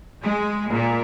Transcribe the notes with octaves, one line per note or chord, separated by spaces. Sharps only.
G#3
A#2